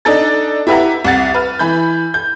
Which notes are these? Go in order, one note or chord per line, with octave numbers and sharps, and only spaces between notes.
D4 D#4 A4 A6
E4 G4 B4 E5 F#5 A#5
C2 F#5 A6
B4 F6
E3 B5 G6
G6